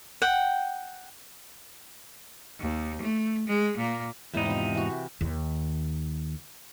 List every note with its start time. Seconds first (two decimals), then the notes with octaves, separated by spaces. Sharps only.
0.22 F#5 G5
2.60 D#2
3.02 A3
3.47 G#3
3.77 A#2 A#3
4.34 E2 G#2 G3 D#4 E4 C5
4.46 C3 F3
4.75 E3 F#4
5.21 D#2 D#3